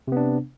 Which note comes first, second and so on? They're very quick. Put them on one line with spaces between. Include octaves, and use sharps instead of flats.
C3 B3 D4